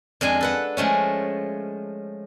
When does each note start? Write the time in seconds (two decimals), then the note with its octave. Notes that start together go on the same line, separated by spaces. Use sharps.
0.21 F2 G#3 D4 G#5
0.41 A4 B4 F#5
0.77 F3 G#3 A3 C#4